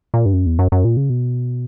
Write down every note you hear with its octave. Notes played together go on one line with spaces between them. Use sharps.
A#2
G2
F#2
E2
F#2
F#2
A#2
C#3
B2